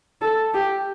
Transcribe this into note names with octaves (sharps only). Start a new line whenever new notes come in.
A4
G4